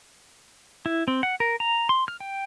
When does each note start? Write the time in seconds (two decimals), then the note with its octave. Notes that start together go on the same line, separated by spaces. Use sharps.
0.86 E4
1.08 C4
1.23 F#5
1.40 A#4
1.60 A#5
1.89 C6
2.08 F6
2.20 G5